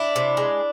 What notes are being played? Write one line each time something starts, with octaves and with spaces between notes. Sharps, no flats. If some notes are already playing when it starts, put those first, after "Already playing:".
Already playing: D4 E4
C3
G#3